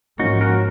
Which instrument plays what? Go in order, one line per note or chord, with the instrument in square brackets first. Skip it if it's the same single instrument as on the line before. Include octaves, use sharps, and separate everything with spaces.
[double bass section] G#2 F3 A#3 C#4 [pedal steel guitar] D#4 F#4
[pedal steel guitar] F#4 A#4